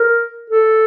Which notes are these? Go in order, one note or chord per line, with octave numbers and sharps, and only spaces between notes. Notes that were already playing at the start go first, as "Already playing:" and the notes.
Already playing: A#4
A4